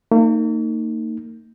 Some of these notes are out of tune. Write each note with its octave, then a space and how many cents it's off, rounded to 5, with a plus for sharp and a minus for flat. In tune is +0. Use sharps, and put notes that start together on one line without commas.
A#3 -40 D#4 -5